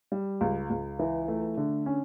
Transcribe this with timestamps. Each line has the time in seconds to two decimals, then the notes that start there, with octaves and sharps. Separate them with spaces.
0.12 G3
0.41 C#2
0.70 C#2
0.99 E3
1.28 A3
1.57 D3
1.86 C#4